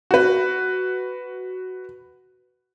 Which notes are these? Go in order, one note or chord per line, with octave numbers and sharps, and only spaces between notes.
F#4 B4